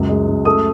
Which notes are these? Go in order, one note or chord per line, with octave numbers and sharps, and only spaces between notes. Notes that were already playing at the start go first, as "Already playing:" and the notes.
Already playing: C#2 F#2
G#3
F#2
A3 D#6